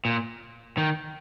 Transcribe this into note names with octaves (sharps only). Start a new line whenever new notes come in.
A#2
D#3